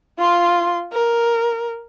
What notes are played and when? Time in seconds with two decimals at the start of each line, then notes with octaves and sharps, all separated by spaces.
0.18 F4 C6
0.93 A#4